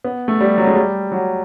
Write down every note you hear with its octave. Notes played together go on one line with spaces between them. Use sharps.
B3
A3
G3
F#3
G#3
G3
F#3